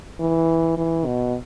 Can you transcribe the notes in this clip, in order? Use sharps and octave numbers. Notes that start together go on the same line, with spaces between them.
E3
E3
B2